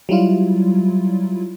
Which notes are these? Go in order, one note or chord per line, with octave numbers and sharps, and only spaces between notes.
F#3 G3 E4 F4